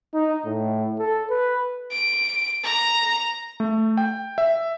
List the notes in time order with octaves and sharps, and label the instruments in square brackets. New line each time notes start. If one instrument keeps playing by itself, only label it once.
[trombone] D#4
A2
A4
B4
[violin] D7
A#5
[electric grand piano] A3
G5
E5